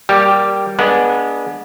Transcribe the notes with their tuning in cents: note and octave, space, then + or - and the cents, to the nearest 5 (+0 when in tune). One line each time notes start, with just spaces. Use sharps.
G3 +0 A#3 +5 G4 -5
G#3 +0 B3 -25 D4 -5